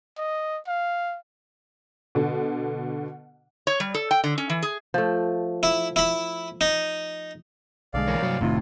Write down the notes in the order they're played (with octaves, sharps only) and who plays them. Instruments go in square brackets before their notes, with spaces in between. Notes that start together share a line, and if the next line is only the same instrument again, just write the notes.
[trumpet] D#5
F5
[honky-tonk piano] B2 D3
[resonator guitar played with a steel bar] C#5
G3
A4
G5
D3
C#4
E3
G#4
[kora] F3 A3
[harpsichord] E4
E4 B5
D#4
[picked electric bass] B1 D3 G#3 [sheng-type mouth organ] D5 F5
[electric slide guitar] E3 A#4 C#5
[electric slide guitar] G2 C3 C#5 [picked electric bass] F#3
[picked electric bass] F1 C3 D#3 [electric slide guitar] A2 [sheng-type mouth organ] F4